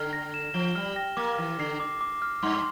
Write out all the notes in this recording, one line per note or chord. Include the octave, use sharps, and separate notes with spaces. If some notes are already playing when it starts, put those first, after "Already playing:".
Already playing: D3 F6
A#6
E7
F3 G7
G3 F6
A#6
A#3 D6
E3 F6
D3 C7
D6
D6
F6
G2 C6